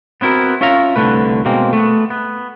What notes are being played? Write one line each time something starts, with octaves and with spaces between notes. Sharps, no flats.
B3 C4 E4 F#4 A#4
C#4 F4 C#5 E5 F5 A#5
C2 D3 E3 A3 B4
B2 G#3 A#3 C4
A3 B3
B3